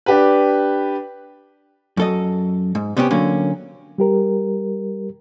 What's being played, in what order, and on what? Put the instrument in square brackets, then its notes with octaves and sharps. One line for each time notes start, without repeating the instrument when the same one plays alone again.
[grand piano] D4 G4 B4
[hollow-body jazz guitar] F#2 A4 D#5
G#2
C3 B3 C#4 G4
D3 F#3 A#3 C#4
[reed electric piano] G3 G4 A#4